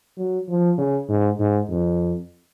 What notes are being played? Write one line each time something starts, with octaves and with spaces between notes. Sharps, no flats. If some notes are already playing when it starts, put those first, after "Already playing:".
F#3
F3
C#3
G#2
G#2
F2